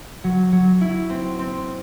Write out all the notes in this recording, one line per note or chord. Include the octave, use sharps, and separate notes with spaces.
F#3
F#3
E4
C4
C4